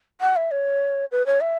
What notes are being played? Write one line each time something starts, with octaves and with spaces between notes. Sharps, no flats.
F#5
E5
C#5
B4
C#5
E5